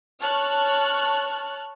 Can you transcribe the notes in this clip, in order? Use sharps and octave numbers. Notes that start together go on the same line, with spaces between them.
C#5 A5 C#6 F6 F#6